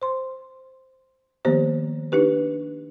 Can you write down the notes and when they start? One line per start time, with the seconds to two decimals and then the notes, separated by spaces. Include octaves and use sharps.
0.02 C5 C6
1.45 D#3 F3 A#3 B3 G4 C5
2.12 D4 D#4 G4 B4